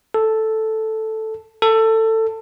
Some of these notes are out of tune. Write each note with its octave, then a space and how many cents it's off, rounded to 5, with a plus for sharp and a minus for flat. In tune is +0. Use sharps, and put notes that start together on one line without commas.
A4 +0
A4 +20